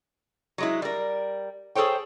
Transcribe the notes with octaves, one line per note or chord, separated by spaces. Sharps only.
F#3 G#3 E4
G3 A#4
G#4 A4 C5 C#5 G5